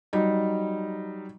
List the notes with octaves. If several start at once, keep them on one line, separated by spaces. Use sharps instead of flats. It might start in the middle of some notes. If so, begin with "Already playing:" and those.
F#3 G3 D#4